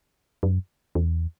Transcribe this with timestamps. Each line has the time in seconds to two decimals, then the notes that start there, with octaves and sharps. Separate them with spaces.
0.43 F#2
0.95 E2